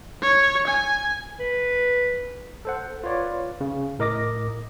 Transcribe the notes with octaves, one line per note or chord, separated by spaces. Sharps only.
C#5
G#5
B4
A4 C5 F#5
F4 B4 C#5 D5
C#3
A2 A#4 D#5 D6 A#6